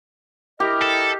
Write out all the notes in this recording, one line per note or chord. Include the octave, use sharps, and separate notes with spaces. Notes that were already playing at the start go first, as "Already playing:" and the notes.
E4 G4 A#4 D#5
A4